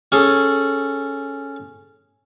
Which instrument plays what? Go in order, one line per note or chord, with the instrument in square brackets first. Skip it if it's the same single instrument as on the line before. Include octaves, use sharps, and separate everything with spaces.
[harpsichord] C#4 G#4 A4